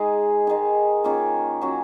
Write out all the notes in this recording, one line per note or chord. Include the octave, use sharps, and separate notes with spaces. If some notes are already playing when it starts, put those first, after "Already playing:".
Already playing: G#3 D#4 G#4
D#3 G#3 D#4
D#3 A#3 C#4 F4
F#3 C#4 F#4